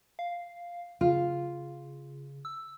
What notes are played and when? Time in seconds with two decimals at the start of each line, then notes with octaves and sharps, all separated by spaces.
0.19 F5
1.01 C#3 F4
2.45 E6